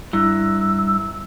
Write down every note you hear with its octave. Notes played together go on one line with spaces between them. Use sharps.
G2 E4 E6